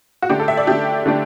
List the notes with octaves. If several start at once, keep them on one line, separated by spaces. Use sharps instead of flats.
F#4
D3 A3 D4 G4
A4
E5
D5
D3 A3 D4 G4
D3 A3 D4